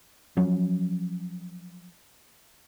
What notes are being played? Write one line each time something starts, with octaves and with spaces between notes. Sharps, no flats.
F3 F#3 C#4